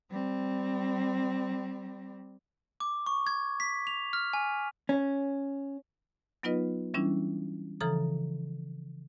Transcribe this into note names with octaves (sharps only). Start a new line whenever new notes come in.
G3 C4
D6
C#6
G#6
B6
F7
F6
G#5
C#4
F#3 B3 D#4 F4 B4 D#5
E3 G3 C#4 D4 E4
C#3 E3 F3 A4 A#5 D#6